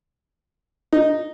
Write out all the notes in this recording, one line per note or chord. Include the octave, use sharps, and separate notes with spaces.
D#4